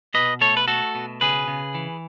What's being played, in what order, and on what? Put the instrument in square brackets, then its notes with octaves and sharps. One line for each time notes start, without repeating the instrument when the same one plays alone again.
[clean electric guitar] B2 B4 D#5
A3 A4 C#5
B4
A3 F#4 A4
B2
C#3 G#4 B4
C#3
E3